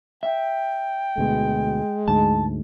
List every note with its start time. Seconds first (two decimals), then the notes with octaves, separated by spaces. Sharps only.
0.23 E5 G5
1.18 D2 B2 G#3
2.08 D2 G#2 A5